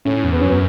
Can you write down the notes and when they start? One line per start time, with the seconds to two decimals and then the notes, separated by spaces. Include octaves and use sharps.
0.05 A2 C#4
0.24 E2
0.33 B3
0.41 F#2 C#4
0.50 B3